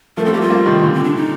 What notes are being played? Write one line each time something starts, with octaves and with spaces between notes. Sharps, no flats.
F3 A3 A#4
C4 A4
G3 A#3 G4
F4
G3 A#3
C3 D#3
A#2 D3
C4
D4
D#4